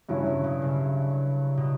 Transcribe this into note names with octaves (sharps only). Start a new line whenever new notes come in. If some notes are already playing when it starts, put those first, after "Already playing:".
G2 C#3 F#3 C#4 E4
C#3
B2
C#3
B2